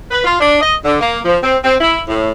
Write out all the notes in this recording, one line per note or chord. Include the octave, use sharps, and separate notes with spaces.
B4
F4
D4
D#5
D3
A#3
F3
C4
C4
E4
A2